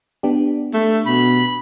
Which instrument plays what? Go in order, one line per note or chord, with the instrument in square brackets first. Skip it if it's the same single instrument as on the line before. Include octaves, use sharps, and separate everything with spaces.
[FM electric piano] B3 D4 G4
[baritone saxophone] A3
[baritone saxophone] B2 [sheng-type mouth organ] B5